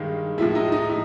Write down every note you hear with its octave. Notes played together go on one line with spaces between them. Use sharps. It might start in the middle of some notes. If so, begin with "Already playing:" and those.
Already playing: G2 D#3 G#3
A2 F3 G#3 E4
D#4
D#4
A2 E4